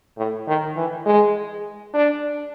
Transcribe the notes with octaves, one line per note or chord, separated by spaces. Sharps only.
A2
D#3
E3
G#3
D4